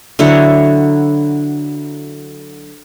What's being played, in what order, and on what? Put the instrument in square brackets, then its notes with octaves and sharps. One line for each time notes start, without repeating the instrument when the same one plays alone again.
[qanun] D3 F#3 E4 C#5